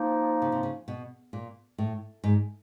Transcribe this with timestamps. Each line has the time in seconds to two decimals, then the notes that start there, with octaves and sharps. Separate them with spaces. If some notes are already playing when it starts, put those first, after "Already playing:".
Already playing: F3 A#3 D#4
0.42 C#3
0.52 C3
0.63 C#3
0.88 B2
1.33 A#2
1.78 A2
2.24 G#2